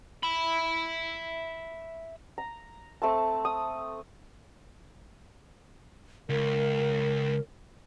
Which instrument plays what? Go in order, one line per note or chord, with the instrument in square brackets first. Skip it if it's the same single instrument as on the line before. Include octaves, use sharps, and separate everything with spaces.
[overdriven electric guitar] E5 B5
[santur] A#5
A3 C4 A5
D#6
[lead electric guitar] C#2 [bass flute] A#4